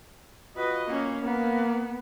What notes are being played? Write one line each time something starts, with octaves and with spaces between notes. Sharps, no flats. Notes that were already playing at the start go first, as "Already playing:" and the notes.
F4 F#4 B4 D#5
A#3 C#4
A#3 B3